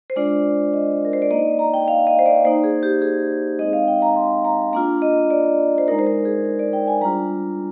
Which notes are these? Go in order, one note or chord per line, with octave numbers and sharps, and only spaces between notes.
C5
G#3 D4 F4 D5
D#5
A#4
C5
D5
A#3 D#4 D#5
A#5
G5
F5
D#5
C5
D5
A#3 D#4 C5
G#4
G4
G#4
G#3 C4 D#4 D#5
F5
G5
A#5
C6
A#5
A#3 D4 F4 A#5
D#5
D5
C5
G#3 D#4 A#4
C5
A#4
G#4
A#4
D5
G5
G#5
G3 D4 F4 A#5